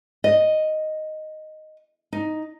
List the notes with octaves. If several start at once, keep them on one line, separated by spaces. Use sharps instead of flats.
D#5
D#4